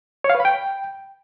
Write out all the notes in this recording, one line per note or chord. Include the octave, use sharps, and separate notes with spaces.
C#5
F5
B4
B5
G5